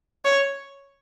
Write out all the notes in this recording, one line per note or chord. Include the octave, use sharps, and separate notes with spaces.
C#5